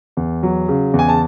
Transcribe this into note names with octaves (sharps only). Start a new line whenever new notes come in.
E2
F#3
C#3
E2
G#5
A5